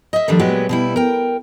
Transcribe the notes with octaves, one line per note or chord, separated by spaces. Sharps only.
D#5 E5
D#3 F3 G3 A3 D4
A#2 F#3 G#3 B3 F#4 G4
B2 G3 E4
A#4 G5